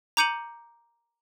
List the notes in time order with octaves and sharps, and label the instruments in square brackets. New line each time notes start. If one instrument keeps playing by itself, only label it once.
[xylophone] A#5 D6 G6 C#7 D#7 F#7